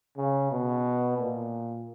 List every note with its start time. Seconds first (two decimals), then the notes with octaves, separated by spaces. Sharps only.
0.17 C#3
0.52 B2
1.18 A#2